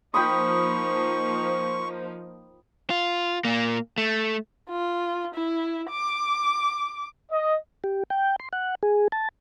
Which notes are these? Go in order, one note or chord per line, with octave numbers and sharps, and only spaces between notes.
F3 A#3 D#4 C5 G5 B5 C#6 D#6
F4
A#2 A#3
A3
F4
E4
D6
D#5
G4
G5
C6
F#5
G#4
A5